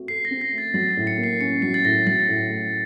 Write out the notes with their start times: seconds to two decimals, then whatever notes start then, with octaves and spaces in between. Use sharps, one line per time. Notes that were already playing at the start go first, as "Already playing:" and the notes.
Already playing: A3 C4 F#4
0.08 A4 C7
0.25 A#6
0.31 C4
0.41 A#6
0.53 A3
0.58 A6
0.74 F#3 A6
0.91 A#6
0.97 A2
1.07 C#7
1.18 A#3
1.24 C7
1.41 C#4 C#7
1.62 F#3 C7
1.74 A6
1.84 A2 A#6
2.07 F#3 A6
2.29 A2
2.50 A3